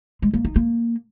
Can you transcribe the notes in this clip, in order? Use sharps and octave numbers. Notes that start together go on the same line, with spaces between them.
G#3
A#3
D#4
A#3